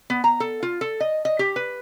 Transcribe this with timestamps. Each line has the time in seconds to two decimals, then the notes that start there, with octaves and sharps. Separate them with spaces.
0.10 B3
0.24 A#5
0.40 A4
0.63 F4
0.81 A4
1.00 D#5
1.25 D#5
1.39 G4
1.56 B4